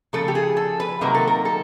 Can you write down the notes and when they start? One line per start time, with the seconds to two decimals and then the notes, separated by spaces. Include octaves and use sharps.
0.13 C#3 F3 A3 A4
0.28 G4
0.35 G#4
0.57 A4
0.80 B4
1.01 C3 D#3 F#3 A#3 A#4
1.14 A4
1.28 A#4
1.45 A4